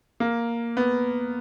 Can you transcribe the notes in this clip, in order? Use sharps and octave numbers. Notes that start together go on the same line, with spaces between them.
A#3
B3